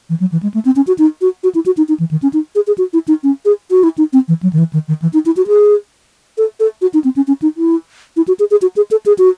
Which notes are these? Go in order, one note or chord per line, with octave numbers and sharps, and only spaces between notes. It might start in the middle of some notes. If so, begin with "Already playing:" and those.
E3
F#3
E3
G#3
A3
C4
C#4
F#4
D#4
F#4
F#4
E4
F#4
D#4
D#4
E3
D#3
C#4
D#4
G#4
G#4
F#4
E4
D#4
C#4
G#4
F#4
E4
D#4
C4
E3
F#3
D#3
E3
D#3
D#3
E3
D#4
E4
F#4
G#4
A4
A4
F#4
D#4
C4
C#4
C#4
D#4
E4
E4
F#4
G#4
G#4
F#4
G#4
A4
G#4
F#4